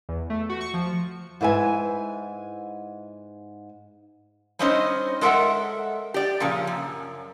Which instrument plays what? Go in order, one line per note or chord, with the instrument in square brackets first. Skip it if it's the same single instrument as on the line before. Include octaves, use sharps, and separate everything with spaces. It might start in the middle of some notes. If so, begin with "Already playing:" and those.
[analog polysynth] E2
A3
F#4
C#6
F3
[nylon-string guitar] G#2 E4 B4 E5 G#5
[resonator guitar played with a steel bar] G3 C4 C#4 D#4 C5 D#5
G#3 A4 A#4 D#5 E5 F#5
G4 D5
A#2 C#3 F3
F#2